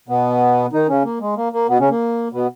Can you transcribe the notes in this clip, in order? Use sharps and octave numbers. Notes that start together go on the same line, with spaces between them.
B2 B3
D#3 D#4
C#3 C#4
A#3
G#3
A#3
A#3
B2 B3
C#3 C#4
A#3
B2 B3